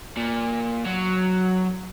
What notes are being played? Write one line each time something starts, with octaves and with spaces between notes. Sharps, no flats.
A#2
F#3